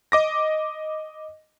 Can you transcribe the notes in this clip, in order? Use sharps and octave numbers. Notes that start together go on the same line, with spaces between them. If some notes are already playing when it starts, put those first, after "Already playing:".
D#5 D6 A#6